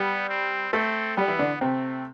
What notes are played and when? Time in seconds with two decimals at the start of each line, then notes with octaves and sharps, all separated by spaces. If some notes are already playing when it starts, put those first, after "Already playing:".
Already playing: G3 B3 G4
0.29 C4
0.73 A3 C4 A4
1.17 G3 B3 G4
1.28 E3 E4
1.39 D3 D4
1.61 C3 A3 C4